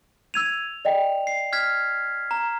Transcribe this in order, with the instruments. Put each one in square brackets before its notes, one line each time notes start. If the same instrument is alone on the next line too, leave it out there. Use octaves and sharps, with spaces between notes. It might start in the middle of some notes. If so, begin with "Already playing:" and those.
[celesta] E6 G#6 D#7 [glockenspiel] F7
[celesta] D5 D#5 G5
[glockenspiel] C7
F6 G#6 B6
A#5